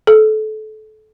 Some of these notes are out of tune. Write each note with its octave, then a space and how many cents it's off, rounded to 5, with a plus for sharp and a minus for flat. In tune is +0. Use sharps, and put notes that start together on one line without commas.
A4 -25